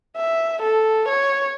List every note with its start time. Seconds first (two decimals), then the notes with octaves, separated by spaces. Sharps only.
0.17 E5
0.62 A4
1.08 C#5